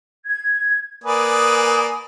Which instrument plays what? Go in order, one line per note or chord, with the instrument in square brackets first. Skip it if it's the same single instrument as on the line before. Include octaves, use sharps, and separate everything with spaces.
[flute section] G#6
[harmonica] A#3 B4 D5 [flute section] G#5 D#6